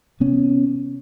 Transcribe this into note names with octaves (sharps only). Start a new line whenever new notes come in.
C3 B3 C#4